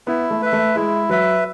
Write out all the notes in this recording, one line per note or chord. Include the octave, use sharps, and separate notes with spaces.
B3 E4
A3
B4 E5
A3
G#3 E4
F#3 B4 E5